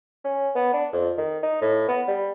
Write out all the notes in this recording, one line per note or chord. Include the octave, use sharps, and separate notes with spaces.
C#4
B3
D4
F2
D#3
D#4
A2
B3
G3